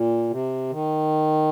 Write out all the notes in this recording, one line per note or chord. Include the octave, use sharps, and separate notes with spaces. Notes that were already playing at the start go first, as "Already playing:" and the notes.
Already playing: A#2
C3
D#3